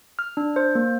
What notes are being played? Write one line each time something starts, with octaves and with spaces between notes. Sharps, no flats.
F6
D4
C5
A#3